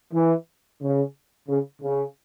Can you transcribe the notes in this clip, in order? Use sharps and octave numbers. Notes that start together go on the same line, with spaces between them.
E3
C#3
C#3
C#3